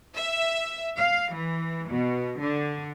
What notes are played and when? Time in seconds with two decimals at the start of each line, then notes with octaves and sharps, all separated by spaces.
0.15 E5
0.97 F5
1.33 E3
1.89 B2
2.39 D3